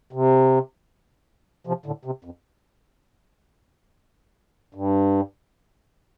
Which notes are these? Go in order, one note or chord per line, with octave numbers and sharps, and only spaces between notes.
C3
C3 F3
A2 D3
C3
F2
G2